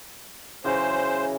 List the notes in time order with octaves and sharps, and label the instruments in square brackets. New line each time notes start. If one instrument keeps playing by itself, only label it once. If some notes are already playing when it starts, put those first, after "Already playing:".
[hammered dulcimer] C#3 E3 F#3 [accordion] C5